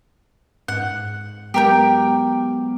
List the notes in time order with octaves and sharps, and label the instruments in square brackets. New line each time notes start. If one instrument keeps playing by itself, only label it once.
[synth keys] G#2 [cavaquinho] F#5
[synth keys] F#3 G#3 B3 [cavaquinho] G4 A#4 G5